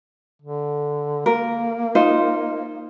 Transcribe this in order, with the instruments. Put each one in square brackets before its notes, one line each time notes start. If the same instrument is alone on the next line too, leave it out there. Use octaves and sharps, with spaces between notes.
[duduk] D3
[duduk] A#3 [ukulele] A#4
[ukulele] D#4 F4 C5